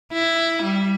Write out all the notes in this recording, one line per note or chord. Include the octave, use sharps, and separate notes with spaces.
E4
G3